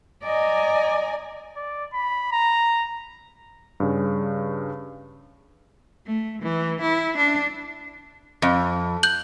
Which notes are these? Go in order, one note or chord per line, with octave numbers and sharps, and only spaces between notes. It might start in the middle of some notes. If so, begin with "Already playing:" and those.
D5 D#5 G#5 A#5
D5
B5
A#5
G2 C#3
A3
E3
E4
D4
F2
F#6 G6 F#7